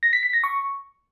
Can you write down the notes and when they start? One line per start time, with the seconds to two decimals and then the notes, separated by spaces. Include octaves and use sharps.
0.03 A#6
0.13 B6
0.23 B6
0.33 A#6
0.44 C#6